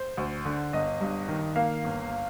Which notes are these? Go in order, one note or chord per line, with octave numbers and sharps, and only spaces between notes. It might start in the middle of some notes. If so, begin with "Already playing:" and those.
Already playing: C5
D2
D3
G1 D#5
G2
D#3
A#3 F5
G1